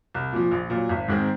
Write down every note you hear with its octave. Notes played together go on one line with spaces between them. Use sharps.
C2
A#2 F3
A#1
A#2
F#3
G#1
G#2 D#3 G#3 C4